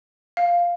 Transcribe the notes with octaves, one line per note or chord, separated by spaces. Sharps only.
F5